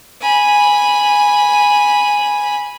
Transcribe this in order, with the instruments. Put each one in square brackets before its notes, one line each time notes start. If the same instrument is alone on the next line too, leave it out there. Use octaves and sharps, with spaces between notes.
[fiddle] G#5 B5